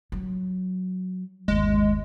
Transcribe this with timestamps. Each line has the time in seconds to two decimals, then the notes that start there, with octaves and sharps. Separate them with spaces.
0.12 F#3
1.48 G1 D#2 G#3